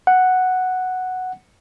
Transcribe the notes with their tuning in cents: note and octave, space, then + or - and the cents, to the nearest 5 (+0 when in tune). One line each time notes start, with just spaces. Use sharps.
F#5 +0